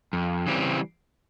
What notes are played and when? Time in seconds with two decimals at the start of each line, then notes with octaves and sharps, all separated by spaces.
0.13 F2
0.46 C#3 E3 G3 C4